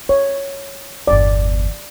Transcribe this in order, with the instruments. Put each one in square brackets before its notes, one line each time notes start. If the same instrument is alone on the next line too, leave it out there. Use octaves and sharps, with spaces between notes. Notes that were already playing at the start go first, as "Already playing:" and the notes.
[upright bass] F4 [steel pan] C#5
[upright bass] G1 E2 [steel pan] D5